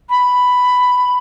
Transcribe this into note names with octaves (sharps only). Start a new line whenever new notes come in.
B5